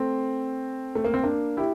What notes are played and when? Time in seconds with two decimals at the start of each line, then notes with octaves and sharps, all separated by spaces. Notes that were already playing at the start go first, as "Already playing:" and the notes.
Already playing: A3 C4
0.95 A3
1.04 A#3
1.14 C4
1.23 A#3 D4
1.57 E4 G4